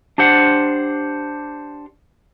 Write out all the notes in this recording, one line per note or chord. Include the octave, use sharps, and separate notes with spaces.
D4 G4 C5 F#5